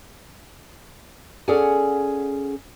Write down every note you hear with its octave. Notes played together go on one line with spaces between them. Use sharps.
C#4 G#4 A4 D5 F#5 G#5